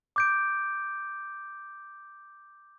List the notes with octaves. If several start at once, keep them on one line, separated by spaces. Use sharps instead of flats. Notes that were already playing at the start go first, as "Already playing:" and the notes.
D6 G6 D7